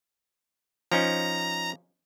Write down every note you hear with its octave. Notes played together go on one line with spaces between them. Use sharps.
F3 C#4 D#4 A#5